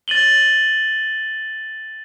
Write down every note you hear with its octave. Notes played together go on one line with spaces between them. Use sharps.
A6 D#7 F#7 G7